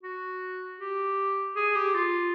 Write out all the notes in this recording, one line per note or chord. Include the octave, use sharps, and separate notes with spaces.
F#4
G4
G#4
G4
F4